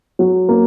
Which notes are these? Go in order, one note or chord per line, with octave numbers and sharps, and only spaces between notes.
F#3
A#3